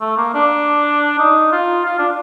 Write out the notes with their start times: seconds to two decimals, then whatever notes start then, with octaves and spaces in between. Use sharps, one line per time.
0.01 A3
0.17 A#3
0.35 D4
1.19 D#4
1.52 F4
1.86 F4
1.99 D4